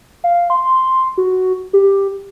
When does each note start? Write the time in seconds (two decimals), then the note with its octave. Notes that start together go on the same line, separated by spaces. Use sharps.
0.24 F5
0.50 C6
1.18 F#4
1.73 G4